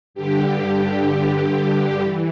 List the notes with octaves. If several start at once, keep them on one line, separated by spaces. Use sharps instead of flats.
G2 D3 G4
G2 D3
E3